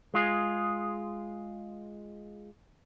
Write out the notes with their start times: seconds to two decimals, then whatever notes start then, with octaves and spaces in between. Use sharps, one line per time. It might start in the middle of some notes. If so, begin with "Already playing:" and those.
0.14 G#3 F4 G#4